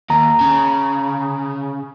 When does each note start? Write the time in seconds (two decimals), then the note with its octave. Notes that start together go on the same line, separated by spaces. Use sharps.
0.10 D#2 A#5
0.41 C#3